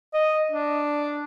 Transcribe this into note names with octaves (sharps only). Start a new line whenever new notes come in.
D#5
D4